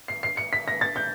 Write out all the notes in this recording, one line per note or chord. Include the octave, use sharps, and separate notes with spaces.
C7
C7
C#7
B6
A#6
A6
G6